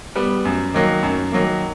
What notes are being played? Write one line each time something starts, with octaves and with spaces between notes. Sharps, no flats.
G3 B3
F#2
D#3 F#3 A#3
F#2
D#3 F#3 A#3